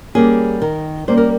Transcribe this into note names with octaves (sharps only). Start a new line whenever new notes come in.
G3 A#3 C#4 G#4
D#3 A#4
G3 A#3 C#4 C5
A#4